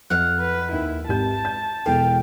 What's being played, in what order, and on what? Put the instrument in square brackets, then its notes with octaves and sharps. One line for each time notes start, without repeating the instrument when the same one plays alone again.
[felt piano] F2 [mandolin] F5 F#5
[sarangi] B4
[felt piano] D#2 [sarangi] E4
[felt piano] G#1 G4 G6 [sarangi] A5
[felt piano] G6
[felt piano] E1 E2 A4 [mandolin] F5 [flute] G5